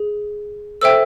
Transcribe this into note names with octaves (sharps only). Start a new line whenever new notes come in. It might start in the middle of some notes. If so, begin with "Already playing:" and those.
Already playing: G#4
A4 C5 E5 G5 E6